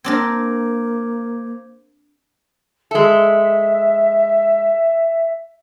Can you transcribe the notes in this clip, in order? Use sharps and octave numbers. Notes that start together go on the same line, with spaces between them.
A#3 C4 D4 A#4 C5 D6 G#6
G#3 A4 E5